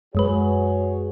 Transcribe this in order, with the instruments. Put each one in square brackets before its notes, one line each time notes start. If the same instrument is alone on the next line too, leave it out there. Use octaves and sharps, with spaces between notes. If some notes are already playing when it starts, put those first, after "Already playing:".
[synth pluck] F#2 G#3 B4 [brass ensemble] F#4 G#4 C#5